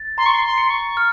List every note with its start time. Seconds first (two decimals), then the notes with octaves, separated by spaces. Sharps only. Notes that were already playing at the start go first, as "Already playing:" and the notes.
Already playing: A6
0.18 A#5 C6
0.26 C#6
0.34 C6
0.45 C6
0.58 C#7
0.66 C6
0.70 C#6
0.97 F6